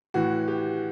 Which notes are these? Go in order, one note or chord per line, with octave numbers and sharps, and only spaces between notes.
A2 E3 F#4
G4